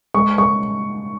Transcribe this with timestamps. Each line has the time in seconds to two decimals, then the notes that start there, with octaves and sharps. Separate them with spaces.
0.14 G#3 C#6
0.38 G#3 C#6